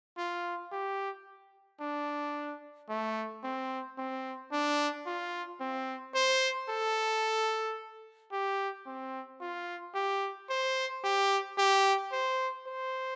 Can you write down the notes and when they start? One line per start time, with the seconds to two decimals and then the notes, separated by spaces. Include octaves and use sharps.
0.17 F4
0.72 G4
1.80 D4
2.89 A3
3.44 C4
3.98 C4
4.52 D4
5.06 F4
5.60 C4
6.15 C5
6.69 A4
8.32 G4
8.86 C4
9.41 F4
9.95 G4
10.50 C5
11.04 G4
11.58 G4
12.12 C5
12.67 C5